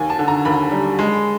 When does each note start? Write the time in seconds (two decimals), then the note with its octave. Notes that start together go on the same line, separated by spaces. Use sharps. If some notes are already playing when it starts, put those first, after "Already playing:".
Already playing: D#2 G#5
0.10 A5
0.19 D3
0.28 A#5
0.45 D#2 B5
0.72 G3
0.99 G#3